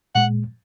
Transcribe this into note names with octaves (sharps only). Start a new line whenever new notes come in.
A#2 G#3 F#5